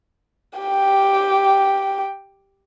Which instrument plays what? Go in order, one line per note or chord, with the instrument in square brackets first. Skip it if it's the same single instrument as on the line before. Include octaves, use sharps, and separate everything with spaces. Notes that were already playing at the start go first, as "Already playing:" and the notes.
[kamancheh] G4 G5